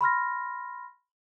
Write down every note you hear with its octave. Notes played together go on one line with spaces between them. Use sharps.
B5 C6 F6 A#6